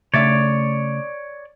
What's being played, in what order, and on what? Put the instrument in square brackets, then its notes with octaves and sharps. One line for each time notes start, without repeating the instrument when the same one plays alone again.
[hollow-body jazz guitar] C#3 A3 E5 [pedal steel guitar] C#5 D5